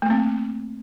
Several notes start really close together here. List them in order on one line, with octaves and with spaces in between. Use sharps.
A3 A#3 C4